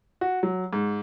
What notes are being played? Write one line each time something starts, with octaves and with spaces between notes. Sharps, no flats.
F#4
F#3
G#2